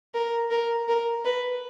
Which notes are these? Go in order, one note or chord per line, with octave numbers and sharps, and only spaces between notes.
A#4
A#4
A#4
B4